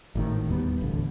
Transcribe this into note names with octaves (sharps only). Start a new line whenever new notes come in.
G#1 A2 D#3
E1 D#2 G3 B3
D1 A1 B2 D3